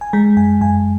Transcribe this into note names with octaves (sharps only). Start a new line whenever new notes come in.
G#5
G#3 A#5
F#2 G#5
F#2 G#5